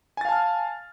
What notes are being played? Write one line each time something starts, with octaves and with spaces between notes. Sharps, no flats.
F5 G#5 A5 F6 A6